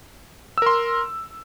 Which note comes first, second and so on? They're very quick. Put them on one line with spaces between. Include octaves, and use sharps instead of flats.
E6 A#4 C6